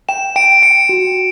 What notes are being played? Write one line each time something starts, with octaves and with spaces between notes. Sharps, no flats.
G5 E7
G5 D7
G5 C#7
F#4